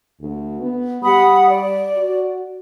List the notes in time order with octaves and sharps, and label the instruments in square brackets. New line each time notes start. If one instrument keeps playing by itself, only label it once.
[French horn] D2
B3
[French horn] G3 [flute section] F#5 B5 D#6
[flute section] D5
[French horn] F#4